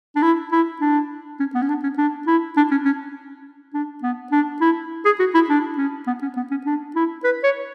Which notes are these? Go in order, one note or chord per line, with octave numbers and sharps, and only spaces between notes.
D4
E4
E4
D4
C#4
B3
C#4
D4
C#4
D4
E4
D4
C#4
C#4
D4
B3
D4
E4
G#4
F#4
E4
D4
C#4
B3
C#4
B3
C#4
D4
E4
B4
C#5